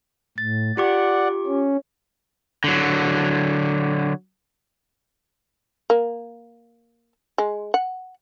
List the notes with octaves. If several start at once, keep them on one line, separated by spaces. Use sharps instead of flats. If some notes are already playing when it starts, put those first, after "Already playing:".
A2 A6
F4 G4 D5 F#5 D6
C#4
D3 F#3
A#3
G#3
F#5